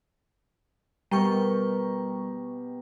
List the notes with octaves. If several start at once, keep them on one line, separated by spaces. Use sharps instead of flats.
B2 G3 G4 A#4 G5 C#6